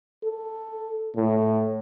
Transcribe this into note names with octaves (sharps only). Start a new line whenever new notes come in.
A4
A2